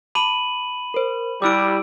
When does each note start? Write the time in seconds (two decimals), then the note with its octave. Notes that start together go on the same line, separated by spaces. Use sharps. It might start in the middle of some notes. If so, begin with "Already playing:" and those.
0.15 A5 B5 D6 D#7 F#7
0.94 A#4 C5
1.42 G3 E4 G4 D6 E6 D7